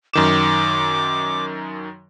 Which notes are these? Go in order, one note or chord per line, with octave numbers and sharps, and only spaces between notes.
F#2 D#3 D6 E7